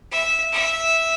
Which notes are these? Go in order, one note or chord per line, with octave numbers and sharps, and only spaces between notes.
E5
E5